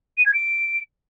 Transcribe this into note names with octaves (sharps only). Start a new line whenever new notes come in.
D#7
G#6
D7